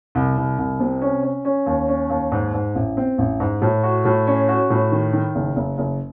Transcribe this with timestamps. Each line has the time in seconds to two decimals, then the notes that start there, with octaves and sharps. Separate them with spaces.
0.15 C2
0.37 C2
0.58 C2
0.80 C3
1.02 C#4
1.23 C#4
1.45 C#4
1.66 D#2
1.88 C#4
2.10 D#2
2.32 G#2
2.54 G#2
2.75 A1
2.97 C4
3.18 A1
3.40 G#2
3.62 A2
3.83 F#4
4.05 A2
4.27 C#4
4.48 F#4
4.70 A2
4.92 D#3
5.13 D#3
5.35 F#1
5.56 F#1
5.78 F#1